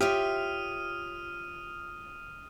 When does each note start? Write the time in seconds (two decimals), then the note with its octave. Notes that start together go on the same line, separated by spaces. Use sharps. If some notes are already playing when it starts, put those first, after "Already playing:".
0.01 F4 G4 C#5 E5 D#6 F6 D#7